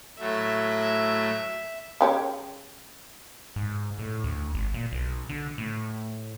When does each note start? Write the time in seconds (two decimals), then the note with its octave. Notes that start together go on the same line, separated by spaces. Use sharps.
0.20 A2 F#3 A3 E5
2.01 C#3 G4 C#5
3.56 G#2
3.99 A2
4.24 D2
4.55 G#1
4.74 A#2
4.92 B1
5.29 D3
5.58 A2